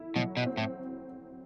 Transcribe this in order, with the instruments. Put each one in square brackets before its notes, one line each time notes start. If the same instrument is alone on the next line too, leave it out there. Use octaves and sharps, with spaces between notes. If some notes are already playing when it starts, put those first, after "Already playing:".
Already playing: [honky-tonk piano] E4
[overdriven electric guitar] B2 [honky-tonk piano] F#3
[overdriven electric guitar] B2
[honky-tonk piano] C4
[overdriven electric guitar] A2